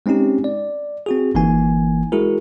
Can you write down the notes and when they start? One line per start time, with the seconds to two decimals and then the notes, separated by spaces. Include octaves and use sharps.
0.06 G#3 C4 C#4 D#4 G4
0.44 D5
1.06 C4 F#4 G#4
1.35 G1 E3 A#3 D#4 G#5
2.12 G#3 E4 F#4 G#4 A#4